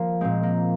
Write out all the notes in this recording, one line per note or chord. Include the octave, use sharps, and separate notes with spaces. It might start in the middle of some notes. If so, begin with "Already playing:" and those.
Already playing: F3 A#3
A#2 G#3 C4
A#3